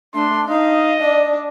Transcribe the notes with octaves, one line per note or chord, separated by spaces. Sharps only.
A3 D4 C6
D#4 D#5 F5
D4 D5